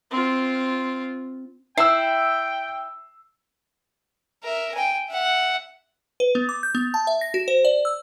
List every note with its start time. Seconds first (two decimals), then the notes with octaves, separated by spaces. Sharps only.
0.11 C4 F4
1.78 E4 G5 E6 C7
4.43 A#4 E5
4.74 G5 G#5
5.09 E5 F#5
6.20 B4
6.35 B3
6.49 D6
6.63 G6
6.75 B3
6.94 A5
7.07 E5
7.21 A#6
7.34 F#4
7.48 C5
7.65 D5
7.85 E6